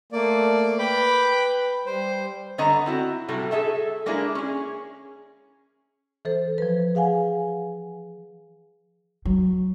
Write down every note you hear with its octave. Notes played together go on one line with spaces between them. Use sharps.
A3 A#3 D5
B4 G5 B5 D6
G3 C5
G2 D3 B3 C#5 D#5 A#5
C4 E4 F#4
A2 C3 G3 A3 F#4
G#4 A4 E5 A5
G#3 A#3 D4 E4 G#4
C#4 G#4
E3 A4 C5
F3 B4
G#4 F5 F#5 G#5
F#3